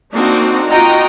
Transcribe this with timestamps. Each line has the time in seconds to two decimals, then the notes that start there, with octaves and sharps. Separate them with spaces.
0.14 A#3 C4 D4 D#4 F#4
0.70 D#4 F4 F#4 D#5 G5 A#5